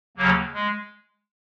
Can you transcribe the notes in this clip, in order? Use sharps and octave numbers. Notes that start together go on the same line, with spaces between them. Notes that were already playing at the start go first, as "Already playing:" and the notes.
D#2 C#3 F#3 A#3
G#3